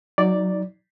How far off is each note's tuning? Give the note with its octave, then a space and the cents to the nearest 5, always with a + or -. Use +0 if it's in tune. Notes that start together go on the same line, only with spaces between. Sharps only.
F#3 +0 D#4 +25 D5 +0